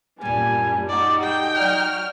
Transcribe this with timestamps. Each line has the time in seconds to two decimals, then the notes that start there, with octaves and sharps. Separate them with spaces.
0.21 F#2 A#2 G3 B3 D4 G#5
0.89 G3 D#4 F#4 D5
1.23 G#4 A4 G5
1.55 F#3 F#4 D5 F6